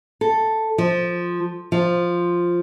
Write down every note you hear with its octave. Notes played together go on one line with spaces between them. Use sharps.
A4
F3
F3